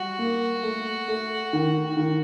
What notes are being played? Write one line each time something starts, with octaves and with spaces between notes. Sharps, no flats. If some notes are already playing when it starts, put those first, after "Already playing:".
Already playing: G3 F#4
A#3
A3
A3
D#3
D#3